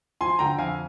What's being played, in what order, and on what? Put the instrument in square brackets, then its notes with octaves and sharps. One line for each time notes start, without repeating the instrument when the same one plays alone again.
[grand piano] F3 G#5 C6
D3 G5 A#5
F2 F5 G#5